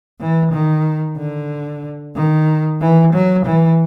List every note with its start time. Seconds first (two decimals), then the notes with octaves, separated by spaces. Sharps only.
0.20 E3
0.52 D#3
1.18 D3
2.16 D#3
2.81 E3
3.13 F#3
3.46 E3